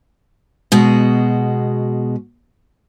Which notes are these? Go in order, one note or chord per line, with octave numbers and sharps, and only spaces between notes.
B2 G#3 F#4